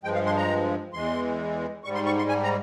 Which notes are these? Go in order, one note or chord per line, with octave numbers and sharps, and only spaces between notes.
G2 F3 G#3 G5
F5
C6
A#5
E2 E3 G#3 C6
G#2 G3 C#6
C6
C#6
C6
G#5
A#5